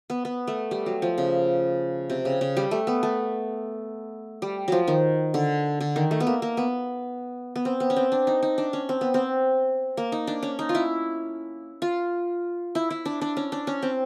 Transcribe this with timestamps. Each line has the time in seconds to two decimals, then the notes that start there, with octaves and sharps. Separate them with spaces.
0.10 B3
0.25 B3
0.48 A3
0.71 G3
0.86 F#3
1.02 F3
1.18 C#3
2.10 C3
2.25 C#3
2.41 C#3
2.57 G3
2.71 A3
2.87 B3
3.03 A3
4.42 G3
4.68 F3 F#3
4.88 D#3
5.34 D3
5.81 D3
5.96 D#3
6.11 A3
6.20 B3
6.27 A#3
6.42 A#3
6.57 B3
7.56 B3
7.65 C4
7.80 B3
7.90 C#4
7.96 C4
8.12 D4
8.27 D#4
8.43 D#4
8.58 D4
8.73 C#4
8.89 C4
9.01 B3
9.14 C4
9.97 A#3
10.12 D#4
10.27 D4
10.43 C#4
10.59 D#4
10.69 F4
10.75 E4
11.82 F4
12.75 E4
12.90 E4
13.05 D4
13.21 D4
13.37 C#4
13.52 D4
13.67 C#4
13.82 C4